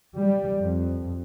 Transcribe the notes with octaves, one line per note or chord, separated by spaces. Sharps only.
G3
F2